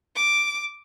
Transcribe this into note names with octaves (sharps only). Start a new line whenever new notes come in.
D6